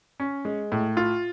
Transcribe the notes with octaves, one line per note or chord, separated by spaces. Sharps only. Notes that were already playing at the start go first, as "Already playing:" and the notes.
C#4
G#3
A2
F4